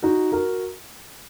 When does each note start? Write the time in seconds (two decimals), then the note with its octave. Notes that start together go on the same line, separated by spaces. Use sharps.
0.03 D#4 F#4
0.32 F#4 A#4